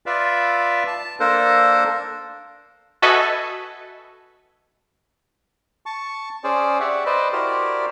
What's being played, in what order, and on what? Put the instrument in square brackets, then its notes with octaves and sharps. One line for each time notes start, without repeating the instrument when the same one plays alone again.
[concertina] F4 B4 D5 E5 F5
A5
A#3 D4 A4 A#4 C5
[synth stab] F#4 A4 B4 D#5 E5 G#5
[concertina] A5 C#6
C#4 G#4 C5 D5
G4 C#5 D5 E5 F#5
B4 C5 D5 D#5
E4 F#4 G4 A#4 C5 D5